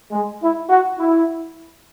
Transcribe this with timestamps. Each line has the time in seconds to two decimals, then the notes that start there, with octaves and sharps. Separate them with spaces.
0.11 G#3
0.41 E4
0.69 F#4
0.98 E4